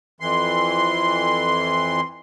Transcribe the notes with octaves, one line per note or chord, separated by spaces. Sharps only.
F2 E3 C6